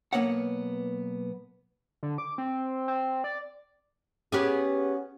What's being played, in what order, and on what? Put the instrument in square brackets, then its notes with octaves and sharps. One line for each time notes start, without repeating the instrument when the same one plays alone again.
[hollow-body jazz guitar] B1 F3 A#3 B3 C#5 F#5
[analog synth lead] D3
D6
C4
C4
D5
[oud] B3 G4 G#4 [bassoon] C#4